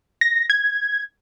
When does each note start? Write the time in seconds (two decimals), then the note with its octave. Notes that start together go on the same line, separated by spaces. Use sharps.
0.21 A#6
0.50 G#6